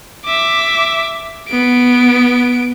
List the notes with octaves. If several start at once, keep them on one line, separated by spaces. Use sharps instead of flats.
E5 D6
B3 D7